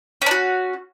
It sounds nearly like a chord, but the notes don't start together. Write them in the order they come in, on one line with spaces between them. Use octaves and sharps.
C#4 D4 F#4